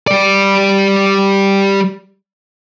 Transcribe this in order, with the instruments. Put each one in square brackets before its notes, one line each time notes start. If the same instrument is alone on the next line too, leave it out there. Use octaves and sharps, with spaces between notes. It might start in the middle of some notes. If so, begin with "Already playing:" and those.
[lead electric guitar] G3 D5